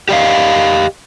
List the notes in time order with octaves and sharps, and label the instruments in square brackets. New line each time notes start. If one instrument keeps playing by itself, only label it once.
[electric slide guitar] G4 D5 D#5 F5